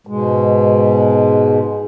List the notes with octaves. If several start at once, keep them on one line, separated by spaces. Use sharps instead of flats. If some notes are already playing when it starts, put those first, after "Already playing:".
G#2 B2 G#3